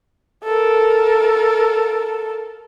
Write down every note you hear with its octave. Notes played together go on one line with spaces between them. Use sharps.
A4 A#4